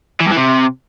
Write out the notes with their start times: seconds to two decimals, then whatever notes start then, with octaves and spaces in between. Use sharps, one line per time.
0.21 E3
0.26 G2
0.31 E3
0.37 C3